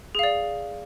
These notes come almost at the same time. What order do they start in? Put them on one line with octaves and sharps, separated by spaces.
G#4 F5 D5